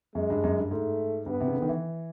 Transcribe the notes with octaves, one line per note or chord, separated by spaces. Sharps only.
F#2 G#3
G2
F#2
G2
G#2 A3
G2 B3
C3
C#3
D3
D#3
E3